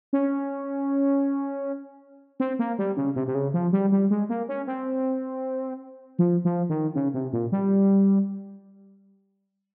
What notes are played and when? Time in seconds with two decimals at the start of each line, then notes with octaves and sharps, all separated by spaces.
0.13 C#4
2.40 C4
2.59 A#3
2.79 G3
2.97 C#3
3.16 C3
3.27 C3
3.35 C#3
3.54 F3
3.73 G3
3.92 G3
4.10 G#3
4.29 A#3
4.49 C#4
4.67 C4
6.19 F3
6.45 F3
6.69 D#3
6.95 C#3
7.14 C3
7.33 A#2
7.52 G3